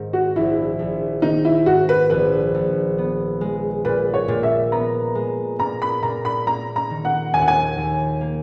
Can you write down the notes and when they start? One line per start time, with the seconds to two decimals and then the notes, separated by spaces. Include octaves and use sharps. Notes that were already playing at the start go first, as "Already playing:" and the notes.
Already playing: G#2 D#3
0.13 F#4
0.36 A#1 E4
0.79 A#1
1.22 D#3 D#4
1.45 E4
1.66 G#2 F#4
1.89 B4
2.10 A#1 B4
2.54 A#1
2.98 B3
3.41 G#3
3.85 A#2 B4
4.14 C#5
4.28 A#2
4.43 E5
4.72 B3 A#5
5.15 G#3
5.59 A#2 A#5
5.82 B5
6.03 A#2 A#5
6.25 B5
6.46 A#3 A#5
6.76 A#5
6.90 D#3
7.05 F#5
7.34 D#2 G#5
7.41 F#5
7.48 G#5
7.77 D#2
8.21 A#3